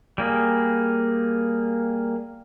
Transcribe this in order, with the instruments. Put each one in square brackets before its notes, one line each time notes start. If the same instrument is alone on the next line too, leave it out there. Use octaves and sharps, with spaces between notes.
[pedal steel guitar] G3 A#3 G#4